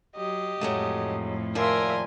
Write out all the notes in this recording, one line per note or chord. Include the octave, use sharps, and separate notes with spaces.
F#3 G4 D#5
F2 A2 F#3 G#3 A3
D#2 F3 A#4 D5 E5 G#5 C6